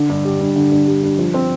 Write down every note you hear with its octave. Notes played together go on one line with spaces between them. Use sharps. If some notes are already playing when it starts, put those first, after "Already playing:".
Already playing: D3
G2
G3
G2
D3
G2
G3
G2
F3
C4